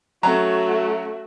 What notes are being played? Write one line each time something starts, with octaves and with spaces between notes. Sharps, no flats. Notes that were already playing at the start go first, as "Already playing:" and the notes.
F#3 A3 C#4 F#4 C#5 A#5